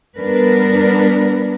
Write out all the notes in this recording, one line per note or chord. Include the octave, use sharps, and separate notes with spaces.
G3 B3 D4 A#4 B4